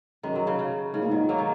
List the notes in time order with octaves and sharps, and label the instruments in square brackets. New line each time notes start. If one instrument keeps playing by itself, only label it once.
[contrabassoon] F#2 [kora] D#3 G#3
[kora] F#3
C#3
C#3
[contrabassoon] G#2 [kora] C#3
[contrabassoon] A#2
[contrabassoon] G#2 [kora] D#3
[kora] F#3 A#3
D#3